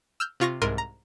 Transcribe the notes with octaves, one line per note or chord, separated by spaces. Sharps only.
E6 F6 G6
C3 F4 C#6 A#6
C2 G#2 A#4 C6 D7 D#7
A#5